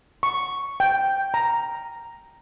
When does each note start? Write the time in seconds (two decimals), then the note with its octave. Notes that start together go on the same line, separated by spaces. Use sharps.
0.23 C#6
0.80 G5
1.34 A#5